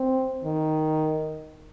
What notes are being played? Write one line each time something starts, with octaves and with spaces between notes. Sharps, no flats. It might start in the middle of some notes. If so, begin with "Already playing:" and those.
Already playing: C4
D#3